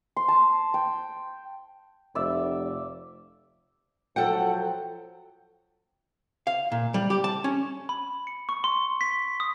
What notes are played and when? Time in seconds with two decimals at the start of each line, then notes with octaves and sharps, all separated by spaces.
0.17 C6
0.28 A5
0.74 G5
2.15 F1 D5 E5
4.16 F3 F#3 A4 F#5 G5
6.47 F5
6.72 A#2
6.94 G3
7.10 G4
7.24 A5
7.44 C#4
7.89 B5
8.27 C#7
8.49 C#6
8.64 C6
9.01 B6
9.40 D#6